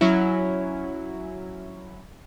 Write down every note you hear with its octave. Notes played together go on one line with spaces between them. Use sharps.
F#3 C#4 E4